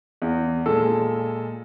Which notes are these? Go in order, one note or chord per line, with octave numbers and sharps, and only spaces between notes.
E2
A#2 G#3 A4 E6